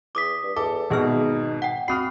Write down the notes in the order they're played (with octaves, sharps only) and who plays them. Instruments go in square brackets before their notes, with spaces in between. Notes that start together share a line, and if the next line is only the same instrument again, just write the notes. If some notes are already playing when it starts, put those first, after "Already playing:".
[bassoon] E2 [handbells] D6 D#6 B6
[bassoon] G2
[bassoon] E2 [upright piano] A4 [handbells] D6
[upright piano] G#1 B2 [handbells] B3 G#4 F6 [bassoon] D#4
[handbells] F#5 G5
[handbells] C4 C7 [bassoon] F#4 [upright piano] B5 D#6 F6